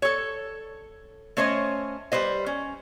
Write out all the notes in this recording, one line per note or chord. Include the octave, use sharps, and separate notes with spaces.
A4 C#5
A3 C#4 C5 C#5 D#5
G3 B4 C5 D#5
C#4